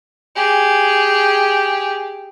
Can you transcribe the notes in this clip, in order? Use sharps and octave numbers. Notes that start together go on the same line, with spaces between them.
G4 G#4